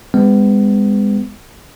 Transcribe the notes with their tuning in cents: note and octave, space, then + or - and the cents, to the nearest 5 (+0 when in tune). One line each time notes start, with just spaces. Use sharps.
G#3 -30 B3 +35